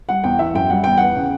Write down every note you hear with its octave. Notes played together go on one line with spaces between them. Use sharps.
G3 F#5
E2 G5
E3 E5
F#2 G5
G3 F#5
E2 G5
B3 F#5
C#3